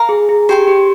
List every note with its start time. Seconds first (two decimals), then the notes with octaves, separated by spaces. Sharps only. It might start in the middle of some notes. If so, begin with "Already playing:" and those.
Already playing: A#4 F5 A#5
0.09 G#4
0.29 G#4
0.49 G4 C5 G5 C6
0.68 G4